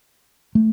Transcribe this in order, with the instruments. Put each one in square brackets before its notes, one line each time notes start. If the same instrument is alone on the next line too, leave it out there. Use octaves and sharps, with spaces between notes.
[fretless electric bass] A3